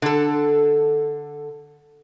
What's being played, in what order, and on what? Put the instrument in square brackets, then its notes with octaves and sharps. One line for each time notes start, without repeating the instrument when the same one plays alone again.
[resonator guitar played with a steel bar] D3 A4